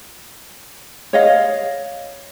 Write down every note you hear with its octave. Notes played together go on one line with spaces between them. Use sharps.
C#5 D#5 F5